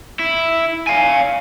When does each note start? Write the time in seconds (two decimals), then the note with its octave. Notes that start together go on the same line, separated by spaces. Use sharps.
0.19 E4
0.87 F5 G#5